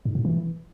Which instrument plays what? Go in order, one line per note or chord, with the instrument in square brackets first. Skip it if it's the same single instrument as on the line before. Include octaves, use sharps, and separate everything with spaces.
[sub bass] G#2
B2
E3